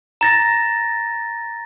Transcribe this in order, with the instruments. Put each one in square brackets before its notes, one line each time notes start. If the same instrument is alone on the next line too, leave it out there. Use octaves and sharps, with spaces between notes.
[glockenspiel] A#5 A6 A#6